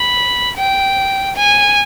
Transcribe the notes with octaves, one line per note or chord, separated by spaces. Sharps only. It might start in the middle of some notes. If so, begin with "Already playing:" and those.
Already playing: B5
G5
G#5